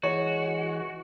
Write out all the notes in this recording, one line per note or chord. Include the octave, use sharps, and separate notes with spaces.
E3 G#3 F#4 C#5